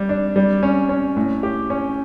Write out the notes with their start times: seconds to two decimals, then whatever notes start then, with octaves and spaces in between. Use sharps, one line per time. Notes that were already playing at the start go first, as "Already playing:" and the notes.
Already playing: G3
0.09 D4
0.36 G3
0.63 C#4
0.89 C#4
1.16 A2
1.43 G4
1.70 C#4